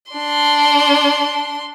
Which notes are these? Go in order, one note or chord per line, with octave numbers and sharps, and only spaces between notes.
D4 C6